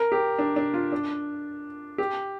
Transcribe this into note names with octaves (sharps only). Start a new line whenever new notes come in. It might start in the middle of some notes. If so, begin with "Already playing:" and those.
Already playing: A#4
G4
D4
D4
F4
D4
G4